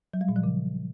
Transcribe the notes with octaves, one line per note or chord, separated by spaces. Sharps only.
F#3
G3
A#2
F3
C#3